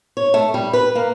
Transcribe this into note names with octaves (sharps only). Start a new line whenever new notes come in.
C#5
A3
G3
B4
A#3